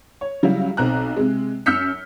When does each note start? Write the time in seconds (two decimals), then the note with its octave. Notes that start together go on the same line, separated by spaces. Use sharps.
0.21 C#5
0.43 C#3 F#3 G3 E4 F#4
0.77 B1 C4 A#5 F#6
1.17 C3 G#3
1.66 F#2 E6 F6 G6 B6 C#7